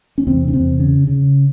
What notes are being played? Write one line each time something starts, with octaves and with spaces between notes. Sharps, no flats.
C#4
E2 C3 C4
C#4
E2 C3 C4
C#3
C#3